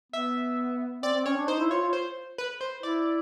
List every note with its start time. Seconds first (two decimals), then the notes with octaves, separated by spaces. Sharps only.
0.12 B3 E5
1.02 C4 D5
1.14 C4
1.25 C#4 C#5
1.37 D4
1.47 D#4 C5
1.59 E4
1.70 F4 C#5
1.82 F4
1.93 C5
2.38 B4
2.61 C5
2.83 E4 D5